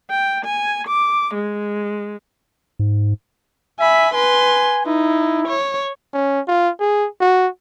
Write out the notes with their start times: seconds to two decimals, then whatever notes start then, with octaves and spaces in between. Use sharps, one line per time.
0.10 G5
0.45 G#5
0.87 D6
1.34 G#3
2.79 G#2
3.80 E5 G#5 B5
4.14 B4 G#5 C6
4.86 D#4 E4
5.48 C#5
6.13 C#4
6.48 F4
6.79 G#4
7.20 F#4